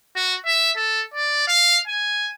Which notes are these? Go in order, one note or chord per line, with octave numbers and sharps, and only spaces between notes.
F#4
E5
A4
D5
F5
G#5